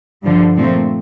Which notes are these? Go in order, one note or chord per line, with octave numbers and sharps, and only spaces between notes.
G2 D3 F3
A#2 F3 A3 C4